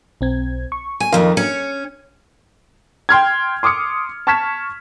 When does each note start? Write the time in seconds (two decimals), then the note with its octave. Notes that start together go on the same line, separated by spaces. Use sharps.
0.21 B1 C4 G#6
0.72 C#6
1.00 G#5
1.12 F2 D#3 A#4 F5 C6
1.37 C#4 C#5 C#7
3.09 G5 C6 F6 G#6
3.63 C6 D6 D#6 F6 C#7
4.27 A5 C#6 F6 G#6 B6 E7